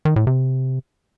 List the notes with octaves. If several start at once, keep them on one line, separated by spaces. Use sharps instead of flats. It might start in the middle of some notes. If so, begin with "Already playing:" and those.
D#3
A2
C3